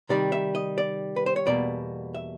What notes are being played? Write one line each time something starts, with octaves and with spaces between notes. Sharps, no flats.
C3 D#3 G3 D5
E5
D#5
D5
B4
C5
C#5
E2 B2 G3 A#3 D5
E5